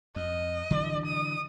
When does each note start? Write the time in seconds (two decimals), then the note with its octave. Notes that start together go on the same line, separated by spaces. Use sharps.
0.16 F2 D#5
0.71 D3 E3 F#3
1.06 D#6